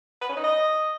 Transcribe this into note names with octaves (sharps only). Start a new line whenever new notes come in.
B4
C#4
D#4
D#5